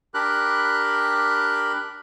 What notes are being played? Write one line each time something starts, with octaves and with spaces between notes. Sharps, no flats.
D4 G4 A#4 B5 F#6